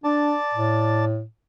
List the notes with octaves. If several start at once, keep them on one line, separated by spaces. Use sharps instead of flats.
D4 D5 A5
A2